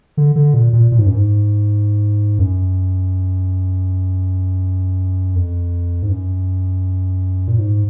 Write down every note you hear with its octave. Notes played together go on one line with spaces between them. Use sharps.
D3
D3
A#2
A#2
A#2
G#2
F#2
G#2
F#2
F2
G#2
F#2
A#2
G#2